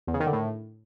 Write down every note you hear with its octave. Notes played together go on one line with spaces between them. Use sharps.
E2
C#3
D#3
D3
A2